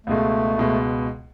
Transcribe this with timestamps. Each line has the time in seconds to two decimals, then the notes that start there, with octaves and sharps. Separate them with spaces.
0.06 C#2 B2 G#3 A3
0.58 C#2 B2 G#3